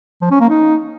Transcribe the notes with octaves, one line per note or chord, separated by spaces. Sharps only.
F3
C#4
A#3
D#4